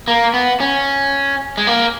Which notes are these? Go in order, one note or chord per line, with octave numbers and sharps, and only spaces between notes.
A#3
B3
C#4
G#3
A#3